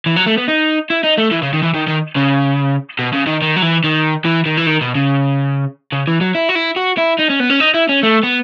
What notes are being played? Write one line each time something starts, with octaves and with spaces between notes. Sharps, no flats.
E3
F#3
A3
B3
D#4
E4
D#4
A3
E3
C#3
D#3
E3
D#3
D#3
C#3
B2
C#3
D#3
D#3
F#3
E3
D#3
E3
D#3
E3
D#3
B2
C#3
C#3
E3
F#3
E4
F#4
E4
F#4
E4
D#4
C#4
B3
C#4
D#4
E4
C#4
A3
B3